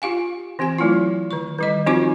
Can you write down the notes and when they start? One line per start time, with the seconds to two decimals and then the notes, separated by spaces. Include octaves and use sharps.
0.02 F4 G4 F5 G#5
0.59 E3 C4 G4 G#5
0.78 F#3 A3 E4 F4
1.31 D#3 C#6
1.58 D#3 G3 D#5
1.86 F3 C4 D#4 F4 F#4 D6